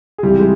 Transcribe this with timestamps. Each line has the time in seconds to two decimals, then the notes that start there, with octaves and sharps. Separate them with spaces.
0.18 G#4
0.23 C#2 C3 E3 G3 G4
0.40 G#3